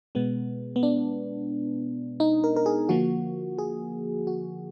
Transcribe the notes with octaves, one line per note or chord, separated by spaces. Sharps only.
B2 G#3 B3
B3
D4
D#4
A#4
A#4
G#4
D3 F3 A#3 F#4
G#4
F#4